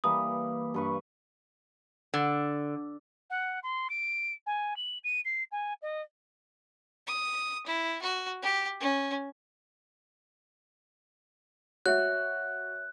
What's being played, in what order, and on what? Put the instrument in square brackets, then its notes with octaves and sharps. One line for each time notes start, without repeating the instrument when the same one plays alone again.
[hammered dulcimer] E3 G3 A#3 [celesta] D#6
[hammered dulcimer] G2 B4 C#6
[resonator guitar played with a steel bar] D3
[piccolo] F#5
C6
D7
G#5
F#7
D#7
C7
G#5
D#5
[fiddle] D#6
E4
F#4
G4
C#4
[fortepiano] F#4 [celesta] C#5 E5 [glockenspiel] F#6